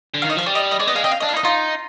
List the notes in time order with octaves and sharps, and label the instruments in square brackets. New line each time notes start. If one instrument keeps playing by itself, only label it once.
[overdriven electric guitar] D3
[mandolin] F5
[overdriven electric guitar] D#3
[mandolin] D#5
[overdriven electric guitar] F3 [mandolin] F5
[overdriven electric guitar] G3 [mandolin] D5
[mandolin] D#5
D#5
[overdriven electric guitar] G#3 [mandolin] D5
[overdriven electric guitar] B3 [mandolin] D#5
[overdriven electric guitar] G#3 [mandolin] F5
[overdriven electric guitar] C4 [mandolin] D#5
[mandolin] F5
D#5
[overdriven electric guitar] D4
[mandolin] F5
[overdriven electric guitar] D#4
[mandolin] D#5
[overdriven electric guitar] D#4 [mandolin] F4